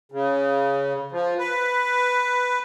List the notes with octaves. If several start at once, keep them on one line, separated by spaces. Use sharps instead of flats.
C#3
F3
B4